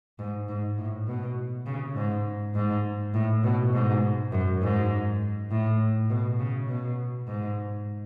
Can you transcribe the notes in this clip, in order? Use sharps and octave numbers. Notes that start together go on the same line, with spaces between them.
G#2
G#2
A2
B2
C#3
G#2
G#2
A2
B2
G#2
F#2
G#2
A2
B2
C#3
B2
G#2